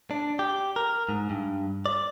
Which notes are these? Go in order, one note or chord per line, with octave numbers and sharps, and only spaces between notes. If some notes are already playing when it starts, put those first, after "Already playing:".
D4
G4
A#4
G#2
G2
D5